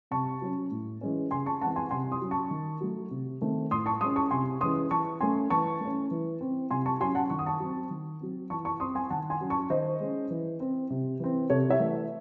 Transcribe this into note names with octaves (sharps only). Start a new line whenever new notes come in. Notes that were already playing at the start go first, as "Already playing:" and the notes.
C3 A5 C#6
F#3 C#4
A2
E3 G#3 C#4
C#3 G#5 C6
A5 C#6
E3 G#3 C4 F#5 A5
G#5 C6
C3 G#5 C6
C6 D#6
F#3 C#4
A5 C#6
D#3
F#3 A3
C3
D#3 A3 C4
A2 C6 D#6
A5 C#6
G#3 C#4 C6 D#6
A5 C#6
C3 G#5 C6
E3 G#3 C#4 C6 D#6
E3 A5 C#6
A3 C#4 G#5 C6
E3 A5 C#6
A3 C#4
E3
C4
C3 G#5 C6
A5 C#6
F#3 C#4 G#5 C6
F#5 A5
D#3 C#6
D#6
A5 C#6
F#3 C4
D#3
F#3 C4
E3 A5 C#6
A5 C#6
C4 C6 D#6
G#5 C6
D#3 F#5 A5
G#5 C6
F#3 C#4
A5 C#6
D#3 C5 D#5
G#3 C#4
E3
C4
C3
E3 C4
C3 A4 C#5
C#5 E5
E3 A3